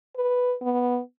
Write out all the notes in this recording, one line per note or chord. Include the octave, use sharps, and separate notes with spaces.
B4
B3